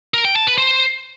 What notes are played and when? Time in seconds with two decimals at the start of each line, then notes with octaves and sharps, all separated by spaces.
0.14 A#4
0.25 G5
0.36 A5
0.47 B4
0.58 C5